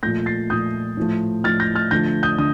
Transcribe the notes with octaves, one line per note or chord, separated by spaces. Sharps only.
A#2 F3 A3 G6 A#6
A6 C7
A#2 F3 A3 D#6 G6
A2 F3 A3
A2 F3 A3 F6 A6
G6 A#6
F6 A6
D3 F3 A3 G6 A#6
D#6 G6
D3 D#6